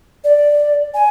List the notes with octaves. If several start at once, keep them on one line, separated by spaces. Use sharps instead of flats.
D5
G#5